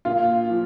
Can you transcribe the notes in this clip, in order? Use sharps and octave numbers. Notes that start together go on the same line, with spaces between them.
A#2 F4
F3